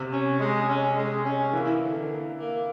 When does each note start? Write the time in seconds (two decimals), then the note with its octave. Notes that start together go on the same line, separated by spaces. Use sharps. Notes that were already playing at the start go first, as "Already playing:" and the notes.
Already playing: C3
0.12 C#4
0.40 G#3
0.68 C#4
0.97 G#3
1.25 C#4
1.53 E3 A#3
1.81 D3
2.10 A#3
2.37 A#3